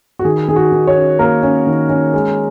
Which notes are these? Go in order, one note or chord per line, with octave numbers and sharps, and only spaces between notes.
F#4
D#3 G#4
D#3 G#4
F#4
D#3
C#5
C#4
A#3 A#4
C#4
D#3
C#4
G#3